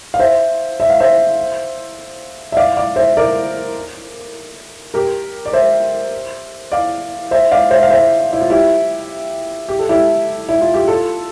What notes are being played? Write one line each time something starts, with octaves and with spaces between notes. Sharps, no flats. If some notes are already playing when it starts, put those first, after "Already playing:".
F5
C5 E5
E5
F5
C5 E5
E5
D5 F5
D5 F5
C5 E5
A#4 D5
G4 A#4
D5
C5 E5
D5 F5
C5 E5
D5 F5
C5 E5
F5
C5 E5
E4
F4
E4 G4
G4
A4
E4 G4
E4
F4
G4
F4 A4